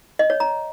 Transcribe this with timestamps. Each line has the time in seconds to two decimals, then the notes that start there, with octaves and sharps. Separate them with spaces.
0.19 D#5
0.30 C#5
0.40 A#5